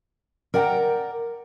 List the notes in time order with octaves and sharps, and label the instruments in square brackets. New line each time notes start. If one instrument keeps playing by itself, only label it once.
[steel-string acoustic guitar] A#4 D5 F#5 G5 A#5